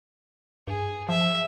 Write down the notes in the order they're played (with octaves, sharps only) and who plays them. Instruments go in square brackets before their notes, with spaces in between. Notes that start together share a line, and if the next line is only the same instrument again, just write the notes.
[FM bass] G2 [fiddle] G#4
[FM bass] F3 [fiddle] E5